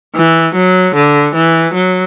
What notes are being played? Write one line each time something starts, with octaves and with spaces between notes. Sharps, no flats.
E3
F#3
D3
E3
F#3